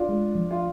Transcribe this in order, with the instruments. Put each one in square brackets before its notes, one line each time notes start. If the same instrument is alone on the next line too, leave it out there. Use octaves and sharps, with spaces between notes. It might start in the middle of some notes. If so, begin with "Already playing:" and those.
Already playing: [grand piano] D4 F4
[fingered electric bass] G#3
F3
[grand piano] F4